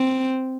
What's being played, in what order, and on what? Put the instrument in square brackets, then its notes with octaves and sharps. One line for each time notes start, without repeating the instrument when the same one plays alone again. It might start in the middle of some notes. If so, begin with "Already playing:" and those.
Already playing: [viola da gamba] C4